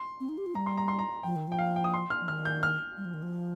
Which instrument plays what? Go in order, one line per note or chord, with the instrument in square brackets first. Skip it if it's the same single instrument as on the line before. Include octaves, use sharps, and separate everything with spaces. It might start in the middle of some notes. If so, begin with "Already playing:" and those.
Already playing: [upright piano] C6
[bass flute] C4
D#4
G4
F4
[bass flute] G3 [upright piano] A#5
[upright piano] C6
A#5
C6
A#5
[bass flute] F3 [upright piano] G5
[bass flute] D#3
[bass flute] F3 [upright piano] G5
[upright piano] F5
G5
D#6
C6
F6
[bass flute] F3
[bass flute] D#3 [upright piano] F6
[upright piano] G6
F6
[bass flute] G3
F3
D#3
F3